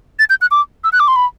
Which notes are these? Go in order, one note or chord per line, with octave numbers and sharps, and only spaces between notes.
A6
G6
F#6
D6
E6
F#6
D6
C6
B5